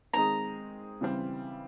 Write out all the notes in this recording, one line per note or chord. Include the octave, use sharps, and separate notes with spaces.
D#3 G#3 C4 D#4 G#4 A#5
C#3 E3 G3 C4